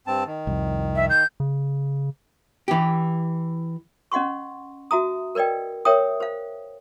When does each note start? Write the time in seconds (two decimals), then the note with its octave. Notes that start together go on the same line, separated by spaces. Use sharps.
0.07 G2 C4 A5
0.26 D#3
0.47 C2 F2
0.95 E5
1.09 G6
1.40 C#3
2.68 E3 G4
4.12 C#4 D#5 F#5 C6 C#6
4.91 F#4 E5 A#5 D#6
5.35 A#4 B4 D5 D#5 G5
5.85 A#4 C#5 E5 G5 D#6
6.20 C5 F5